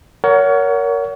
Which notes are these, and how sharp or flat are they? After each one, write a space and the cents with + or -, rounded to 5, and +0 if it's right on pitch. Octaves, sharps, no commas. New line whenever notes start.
A#4 +0 C#5 +30 F#5 +0